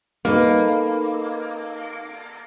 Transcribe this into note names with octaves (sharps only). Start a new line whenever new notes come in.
A#3 D#4 A4 B4